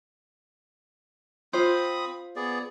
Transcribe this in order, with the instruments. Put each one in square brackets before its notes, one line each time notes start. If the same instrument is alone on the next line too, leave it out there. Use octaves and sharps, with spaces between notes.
[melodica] C4 B5 D#6 [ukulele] F4 C5
[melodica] B3 G#4 D5